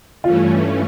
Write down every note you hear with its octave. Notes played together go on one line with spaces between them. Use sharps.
G2 E3 A3 C#4 F4